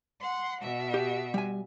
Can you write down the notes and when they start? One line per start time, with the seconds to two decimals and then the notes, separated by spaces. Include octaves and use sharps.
0.21 F#5 C6
0.61 B2 E5
0.94 G4
1.34 G3 G#5